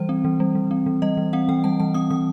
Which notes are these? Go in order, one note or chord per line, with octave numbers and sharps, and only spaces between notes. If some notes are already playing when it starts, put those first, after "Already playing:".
Already playing: E3 G3 C5
C4
E3
G3
E3
C4
E3
G3 D#5
E3
C4 F#5
E3 G5
G3 A5
E3 A5
C4 D#6
E3 D#6